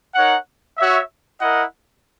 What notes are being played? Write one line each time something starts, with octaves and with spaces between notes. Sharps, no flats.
D#4 A#4 C#5 F#5
F#4 C#5 E5
E4 A#4 D#5 F#5